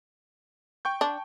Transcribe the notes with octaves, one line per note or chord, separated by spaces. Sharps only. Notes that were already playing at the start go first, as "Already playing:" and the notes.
G5 C#6 G6
D4